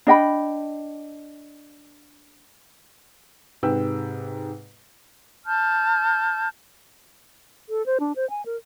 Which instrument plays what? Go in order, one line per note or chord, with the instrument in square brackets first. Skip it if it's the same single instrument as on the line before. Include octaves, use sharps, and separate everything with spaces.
[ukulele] D4 D#5 G5 B5
[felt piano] G#2 C3 B4 G5 E6
[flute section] A5 F6 G6
[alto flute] A4
C5
D4
C5
G#5
A#4